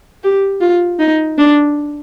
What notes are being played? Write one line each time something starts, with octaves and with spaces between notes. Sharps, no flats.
G4
F4
D#4
D4